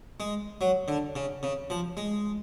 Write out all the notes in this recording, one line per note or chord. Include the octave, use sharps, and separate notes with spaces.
G#3
F#3
D3
C#3
C#3
F3
G#3